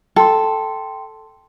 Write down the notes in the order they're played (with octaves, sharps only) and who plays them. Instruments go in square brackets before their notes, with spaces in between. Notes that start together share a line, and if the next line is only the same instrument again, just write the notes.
[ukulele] A4 [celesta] G5 C6